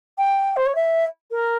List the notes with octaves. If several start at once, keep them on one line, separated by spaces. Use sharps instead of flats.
G5
C5
C#5
E5
A#4